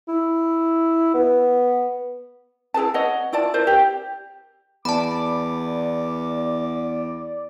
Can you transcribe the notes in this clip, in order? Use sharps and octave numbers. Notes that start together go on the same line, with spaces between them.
E4
B3
E4 G#4 B4 A5
C#5 D#5 F#5
E4 F4 D5 A5
E4 A#4 C5 D5
G4
E2 D5 A5 B5 D6